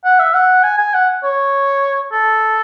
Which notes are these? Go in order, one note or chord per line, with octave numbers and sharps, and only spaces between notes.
F#5
E5
F#5
G#5
G#5
F#5
C#5
A4